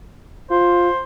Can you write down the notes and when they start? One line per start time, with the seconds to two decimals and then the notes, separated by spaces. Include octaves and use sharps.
0.51 F4 C5